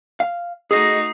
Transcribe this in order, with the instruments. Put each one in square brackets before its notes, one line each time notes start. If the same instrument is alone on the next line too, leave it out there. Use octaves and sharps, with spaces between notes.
[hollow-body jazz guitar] F5
[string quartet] A3 D#4 F#4 [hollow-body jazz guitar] G#4 [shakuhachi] D#5 [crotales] D#6 C7